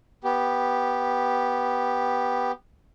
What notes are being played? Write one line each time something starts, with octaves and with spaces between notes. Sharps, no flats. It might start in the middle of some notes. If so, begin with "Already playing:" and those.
B3 G4